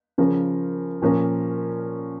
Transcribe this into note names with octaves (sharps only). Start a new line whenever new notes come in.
C#3 F3 C#4 A#4
A#2 F3 C#4 A#4